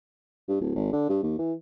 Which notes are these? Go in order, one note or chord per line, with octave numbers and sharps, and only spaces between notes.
G2
D1
G#1
D3
G2
D#2
E3